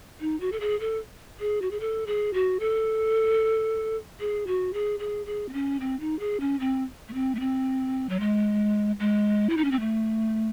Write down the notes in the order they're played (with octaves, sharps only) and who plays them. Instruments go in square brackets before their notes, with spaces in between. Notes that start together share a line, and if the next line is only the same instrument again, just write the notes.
[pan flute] D#4
F#4
A4
G#4
A4
G#4
F#4
G#4
A4
G#4
F#4
A4
G#4
F#4
G#4
G#4
G#4
C4
C#4
C4
D#4
G#4
C#4
C4
A3
C4
A3
C4
F#3
G#3
G#3
E4
D#4
C#4
C4
A3